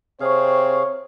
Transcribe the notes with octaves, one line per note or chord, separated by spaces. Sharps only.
C3 C4 G#4 C5 C#5 F5 C#6